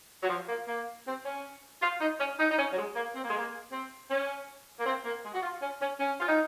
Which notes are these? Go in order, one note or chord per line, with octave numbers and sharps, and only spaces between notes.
F#3
F3
A#3
A#3
C4
C#4
F4
D#4
C#4
D#4
D#4
C#4
F#3
G#3
A#3
C4
A#3
G#3
A#3
C4
C#4
A#3
C4
A#3
G#3
F#4
F4
C#4
C#4
C#4
F4
D#4